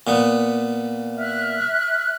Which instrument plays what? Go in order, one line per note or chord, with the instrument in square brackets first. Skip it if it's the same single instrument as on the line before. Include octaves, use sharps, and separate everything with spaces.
[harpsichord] A#2 B3
[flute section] E5 F6 F#6